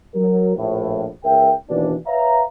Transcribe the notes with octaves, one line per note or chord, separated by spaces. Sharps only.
F#3 A#4
A#1 A2
C#2 A#4 E5 G5
D#2 B2 E3 D4
B4 C#5 E5 F5 A#5